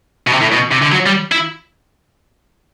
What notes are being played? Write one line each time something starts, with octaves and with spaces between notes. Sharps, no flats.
B2
C3
A2
B2
C3
D3
F#3
G3
E4